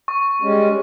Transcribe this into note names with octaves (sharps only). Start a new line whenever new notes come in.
C#6
G3 G#3 C#4